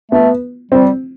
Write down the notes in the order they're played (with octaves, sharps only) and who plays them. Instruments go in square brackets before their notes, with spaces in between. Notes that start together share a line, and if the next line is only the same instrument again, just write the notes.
[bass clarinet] A3 [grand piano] B3
[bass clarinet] G3 [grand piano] C4